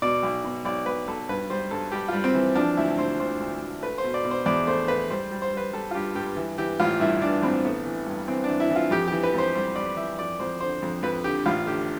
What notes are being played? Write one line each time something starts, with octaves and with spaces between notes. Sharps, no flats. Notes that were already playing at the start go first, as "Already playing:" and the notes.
B2 D5
B1
B2
B1 D5
B1 B4
B1 A4
G2 B4
G3 C5
G2 A4
G3 G4
G3 F4
C4
E3
F3 D4
D2 E4
D2 C5
D2 C5
D2
D2
A3 B4
C5
B2
D5
B2
C5
E2 D5
A3 C5
A3 B4
G3 C5
G3
C5
G3 B4
G3 A4
F4
G2 G4
G2 G4
E3
E3 G4
A1 F4
G2 E4
E3 D4
A1 C4
A3 B3
E3
G2
E3 C4
D4
E3
E4
E3
F4
F2 G4
E3 G4
B4
F2 C5
G3 C5
G3 D5
E3 E5
F2 D5
F2 C5
D3 C5
F2
F2 B4
D3 G4
A1 F4
D3 G4